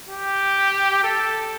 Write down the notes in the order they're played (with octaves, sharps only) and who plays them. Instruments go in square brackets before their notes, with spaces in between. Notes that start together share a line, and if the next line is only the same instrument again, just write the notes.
[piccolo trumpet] G4
A4